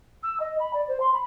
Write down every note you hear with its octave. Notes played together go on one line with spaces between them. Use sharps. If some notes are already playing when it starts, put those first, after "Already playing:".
E6
D#5
B5
D5
C5
C6
B5